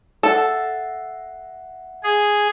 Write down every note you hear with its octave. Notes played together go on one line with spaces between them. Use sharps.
A4 E5 F#5
G#4